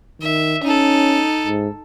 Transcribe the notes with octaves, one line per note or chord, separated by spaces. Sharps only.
D#3 E5
C#4 D#4 A4
G#2